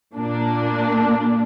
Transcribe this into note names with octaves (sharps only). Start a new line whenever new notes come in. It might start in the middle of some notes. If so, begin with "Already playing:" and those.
A#2 A#3 D4